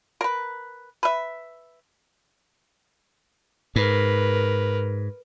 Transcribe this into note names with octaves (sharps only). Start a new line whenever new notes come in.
A#4 B4
B4 E5
G#2 A#4 B4